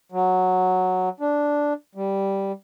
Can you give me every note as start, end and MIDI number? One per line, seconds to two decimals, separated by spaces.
0.12 1.09 54
1.20 1.73 62
1.95 2.52 55